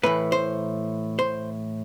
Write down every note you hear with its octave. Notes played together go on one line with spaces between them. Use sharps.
A2 E3 B4
C5
C5